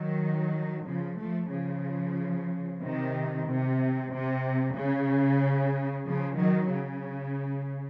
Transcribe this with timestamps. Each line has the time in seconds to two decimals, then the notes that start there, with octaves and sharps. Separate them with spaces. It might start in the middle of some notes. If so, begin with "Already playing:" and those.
Already playing: D#3 F#3
0.86 C#3 F3
1.20 F3 A3
1.52 C#3 F3
2.82 C3 D#3
3.48 C3
4.13 C3
4.77 C#3
6.07 C#3 F3
6.39 D#3 F#3
6.73 C#3